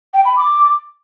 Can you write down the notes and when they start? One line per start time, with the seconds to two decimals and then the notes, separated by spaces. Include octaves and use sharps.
0.14 G5
0.25 B5
0.36 D6